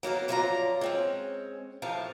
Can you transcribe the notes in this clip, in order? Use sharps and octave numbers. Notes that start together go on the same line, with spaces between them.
F#3 A#3 B3 A#4
F#2 F3 F#3 F4 D5 A#5
G#3 C4 C#4
A2 C3 F3 A#4 F5 A5